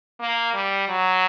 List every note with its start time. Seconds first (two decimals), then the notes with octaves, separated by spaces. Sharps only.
0.19 A#3
0.54 G3
0.89 F#3